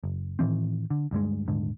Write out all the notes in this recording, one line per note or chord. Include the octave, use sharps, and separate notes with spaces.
F#1
A2 D#3 E3 C4
D3
D2 G2 G3 G#3
D#1 G#2 D3